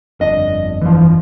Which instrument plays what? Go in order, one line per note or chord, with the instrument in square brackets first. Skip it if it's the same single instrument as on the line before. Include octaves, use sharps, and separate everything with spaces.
[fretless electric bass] G1 F2 D4 [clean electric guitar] D#5
[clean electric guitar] E3 F3